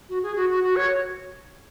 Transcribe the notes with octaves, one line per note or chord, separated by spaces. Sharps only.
F#4
G#4
F#4
F#4
F#4
C#5